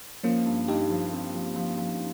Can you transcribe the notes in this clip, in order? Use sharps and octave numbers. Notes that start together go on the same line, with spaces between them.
F3 A#3 C#4
G2
G2 D#4 G4
F3
C4
F3
F3
F3